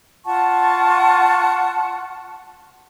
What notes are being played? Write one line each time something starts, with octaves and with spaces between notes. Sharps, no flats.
F4 F#5 A5 C#6